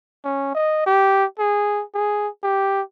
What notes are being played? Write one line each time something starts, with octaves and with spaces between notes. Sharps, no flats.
C#4
D#5
G4
G#4
G#4
G4